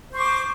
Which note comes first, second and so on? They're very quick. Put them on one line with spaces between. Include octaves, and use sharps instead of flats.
C5 C#6 D6